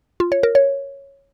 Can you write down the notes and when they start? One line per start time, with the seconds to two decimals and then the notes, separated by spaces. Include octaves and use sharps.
0.20 F4
0.32 C#5
0.43 A#4
0.55 C#5